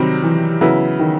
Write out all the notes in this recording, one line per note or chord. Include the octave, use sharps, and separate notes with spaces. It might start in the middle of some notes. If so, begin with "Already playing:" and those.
Already playing: C3 D#3 F#3 G3 C4
E3
C#3 F#3 B3 E4
D#3